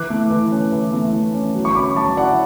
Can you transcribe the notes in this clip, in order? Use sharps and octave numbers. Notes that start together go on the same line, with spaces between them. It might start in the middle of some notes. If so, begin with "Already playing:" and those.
Already playing: E3 D6 F#6
A3
E3
C#4
E3
A3
E3
C#4
F#3
C#6
C#4 B5 D6
F#3 A5 C#6
E4 D5 F#5